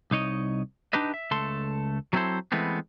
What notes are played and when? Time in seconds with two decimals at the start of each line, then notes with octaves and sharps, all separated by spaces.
0.11 C2 D#4 C#5 D#5
0.93 D4 D#4 G4 B4 D#5
1.14 E5
1.31 C#2 A3 A4 C6
2.13 F#3 B3 C4 E4 A4 C5
2.52 E3 G#3 A3 B3 C4